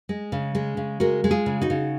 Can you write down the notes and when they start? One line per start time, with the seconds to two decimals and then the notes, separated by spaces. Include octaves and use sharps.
0.09 G#3
0.32 C#3
0.55 G#3
0.77 C#3
1.00 G#3 F#4 A#4
1.24 G#3
1.31 F4 G#4
1.46 C#3
1.61 D#4 F#4
1.70 C#3